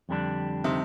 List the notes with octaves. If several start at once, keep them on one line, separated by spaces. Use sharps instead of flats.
F2 D3 G3 D4
C3 D#3